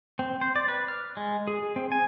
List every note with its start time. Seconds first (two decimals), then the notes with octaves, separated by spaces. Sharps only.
0.19 C4
0.41 C5
0.56 D5
0.68 B4
0.88 F6
1.17 G#3
1.48 G#4
1.76 C4
1.92 G#5